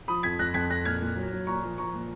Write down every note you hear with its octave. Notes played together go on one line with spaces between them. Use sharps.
F3 B5 D#6
F2 G#6 B6
F2 F#6 A#6
F2 G#6 B6
F2 F#6 A#6
A#2 F6 G#6
A#2
F#3
F#3
A#2 A#5 C#6
F3
F3 A#5 C#6
A#2